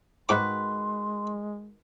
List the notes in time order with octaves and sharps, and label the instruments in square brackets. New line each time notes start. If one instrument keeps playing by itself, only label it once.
[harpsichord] G#2 D6 [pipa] D#3 F#4 B4 [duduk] G#3 [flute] C6